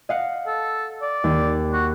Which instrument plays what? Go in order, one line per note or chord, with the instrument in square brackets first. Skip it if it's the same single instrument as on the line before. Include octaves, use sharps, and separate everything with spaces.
[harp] D#5 F5 F#5
[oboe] A4
D5
[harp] D#2
[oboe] F#4